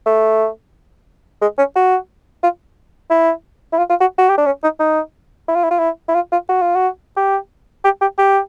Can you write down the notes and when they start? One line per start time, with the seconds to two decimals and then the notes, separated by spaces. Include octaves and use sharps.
0.06 A3
1.42 G#3
1.58 C#4
1.76 F#4
2.43 F4
3.10 E4
3.73 E4
3.78 F4
3.90 F4
4.00 F#4
4.18 F#4
4.29 G4
4.38 D4
4.46 C#4
4.63 D#4
4.80 D#4
5.48 E4
5.55 F4
5.63 E4
5.71 F4
5.79 E4
6.09 E4
6.15 F4
6.32 F4
6.49 F#4
6.62 F4
6.75 F#4
7.16 G4
7.84 G4
8.01 G4
8.18 G4